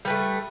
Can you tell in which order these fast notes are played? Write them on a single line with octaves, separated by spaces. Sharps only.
G3 B3 A3